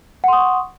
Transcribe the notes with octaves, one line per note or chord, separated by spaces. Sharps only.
F#5 C6 C#6 D#6